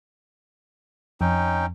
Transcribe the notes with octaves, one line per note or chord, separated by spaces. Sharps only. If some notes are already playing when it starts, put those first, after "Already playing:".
F2 C#4 D#4 G5